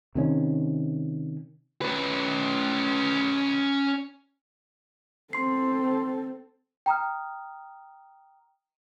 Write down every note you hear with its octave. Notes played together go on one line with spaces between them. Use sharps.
C3 D#3 C#4
C#4 B4
C4 A4 C6 C7
G5 A#5 D#6 F6